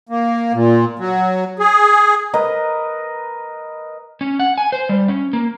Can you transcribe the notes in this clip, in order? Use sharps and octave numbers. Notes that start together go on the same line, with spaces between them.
A#3
A#2
F#3
G#4
A#4 B4 D#5
C#4
F#5
G#5
C5
G3
C#4
A#3